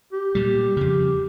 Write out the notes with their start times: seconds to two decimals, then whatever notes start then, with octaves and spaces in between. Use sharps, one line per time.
0.12 G4
0.35 A#2 G3
0.77 F2 C#3